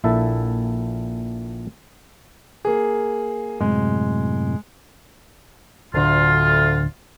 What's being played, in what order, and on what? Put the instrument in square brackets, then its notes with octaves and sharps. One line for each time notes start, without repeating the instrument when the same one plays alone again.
[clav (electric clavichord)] A#1 A#2 E4 A4 E5 A5
[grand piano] A#3 G#4
[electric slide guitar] F#2 A2 C3 [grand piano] G#3
[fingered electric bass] D1 D3 [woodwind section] D2 F4